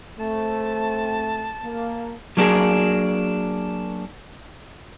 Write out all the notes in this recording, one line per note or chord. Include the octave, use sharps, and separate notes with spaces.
A3 C4 A5
A#3
F#3 A#3 D4 G4 G#4 A#4